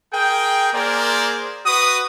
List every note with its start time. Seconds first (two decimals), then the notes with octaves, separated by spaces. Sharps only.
0.12 G#4 A#4 G5
0.72 A#3 G#4 A#4 C5 D5
1.65 F#4 B4 D#6